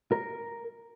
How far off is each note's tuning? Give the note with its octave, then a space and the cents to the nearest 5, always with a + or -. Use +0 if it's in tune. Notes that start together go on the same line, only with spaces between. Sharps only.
A#4 +0